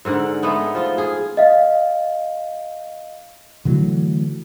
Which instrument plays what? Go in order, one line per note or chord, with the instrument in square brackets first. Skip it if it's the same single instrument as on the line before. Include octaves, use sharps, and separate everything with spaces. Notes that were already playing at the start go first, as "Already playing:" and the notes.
[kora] G#2 D3 A#4 F#5
G#3 A3 B3 D#4
F3 F4
G#4
[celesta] D#5 F5
[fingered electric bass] D3 E3 F#3 A3